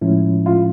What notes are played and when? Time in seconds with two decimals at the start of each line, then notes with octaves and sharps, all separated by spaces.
0.01 A2 F3 G#3 C#4 E4
0.46 F4